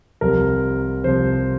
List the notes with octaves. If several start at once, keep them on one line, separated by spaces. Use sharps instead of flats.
C2 C3 F3 A#4
C2 C3 F3 C5